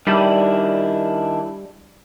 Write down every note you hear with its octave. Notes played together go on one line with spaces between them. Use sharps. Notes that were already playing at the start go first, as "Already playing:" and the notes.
D#3 G3 D4 E4